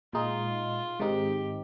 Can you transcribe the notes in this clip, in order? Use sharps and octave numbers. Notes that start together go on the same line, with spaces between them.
A#2 G#3 D#4 F4
G#2 D#3 G#3 C4 D#4 G4